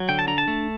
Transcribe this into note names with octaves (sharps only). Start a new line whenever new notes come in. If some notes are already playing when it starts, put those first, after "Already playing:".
Already playing: F#3
D3 G5
A5
D4 A#5
A5
A3